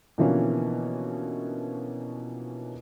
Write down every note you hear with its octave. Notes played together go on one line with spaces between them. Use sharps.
B2 D3 E3 F3 A#3 C#4